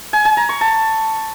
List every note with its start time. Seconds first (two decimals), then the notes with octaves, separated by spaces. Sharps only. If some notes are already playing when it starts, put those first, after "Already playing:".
0.13 G#5
0.25 G#5
0.37 A#5
0.49 C#6
0.61 A5